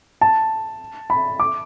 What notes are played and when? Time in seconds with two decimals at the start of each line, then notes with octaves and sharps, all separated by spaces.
0.21 A5
1.10 B5
1.40 D6